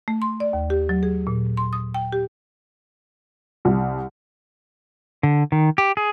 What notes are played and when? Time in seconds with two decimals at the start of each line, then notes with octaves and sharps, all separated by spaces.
0.08 A3
0.22 C6
0.40 D5
0.53 D#2
0.70 G4
0.89 F#3
1.03 G#4
1.27 A#2
1.57 C6
1.73 D#6
1.94 G5
2.12 G4
3.65 C2
5.23 D3
5.52 D#3
5.78 G4
5.97 G#4